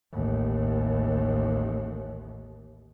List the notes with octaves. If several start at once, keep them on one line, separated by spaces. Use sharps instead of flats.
A1 D#2